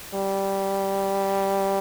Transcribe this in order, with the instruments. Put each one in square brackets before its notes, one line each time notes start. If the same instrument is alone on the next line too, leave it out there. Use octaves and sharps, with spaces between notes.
[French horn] G3